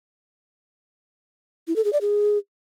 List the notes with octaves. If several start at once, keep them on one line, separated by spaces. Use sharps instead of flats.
E4
A4
G#4
D5
G#4